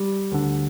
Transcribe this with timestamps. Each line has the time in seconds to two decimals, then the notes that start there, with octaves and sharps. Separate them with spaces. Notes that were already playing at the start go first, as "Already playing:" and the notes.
Already playing: G3
0.32 D2 D3